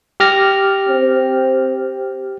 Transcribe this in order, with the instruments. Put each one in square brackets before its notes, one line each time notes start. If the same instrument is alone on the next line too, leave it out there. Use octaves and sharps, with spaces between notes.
[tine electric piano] G4 F6 A#6
[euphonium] C4